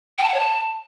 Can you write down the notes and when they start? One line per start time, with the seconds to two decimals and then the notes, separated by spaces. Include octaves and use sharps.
0.18 G5
0.23 A5
0.28 F#5
0.34 C#5
0.39 A5